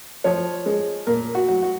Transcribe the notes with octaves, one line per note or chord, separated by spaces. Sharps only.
F3 C#5
G#3
A#2 A#4
F#4
F#3
F#4